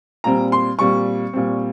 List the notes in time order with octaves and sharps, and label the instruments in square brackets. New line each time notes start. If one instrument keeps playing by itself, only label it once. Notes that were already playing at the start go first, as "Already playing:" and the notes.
[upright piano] A#2 G3 C4 A#5
C6
A#2 G3 C4 C#6
A#2 G3 C4